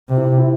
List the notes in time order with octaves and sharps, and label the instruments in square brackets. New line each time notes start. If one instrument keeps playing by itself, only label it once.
[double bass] C3
[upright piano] E4
E4